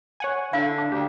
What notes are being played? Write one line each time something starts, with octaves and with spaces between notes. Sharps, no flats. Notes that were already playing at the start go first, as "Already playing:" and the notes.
C#5 F#5 G#5
D3 E4 F5
D4
D2 G4